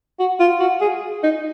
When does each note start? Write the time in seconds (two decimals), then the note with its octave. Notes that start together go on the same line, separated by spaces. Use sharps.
0.19 F#4
0.40 F4
0.60 F#4
0.81 G#4
1.23 D#4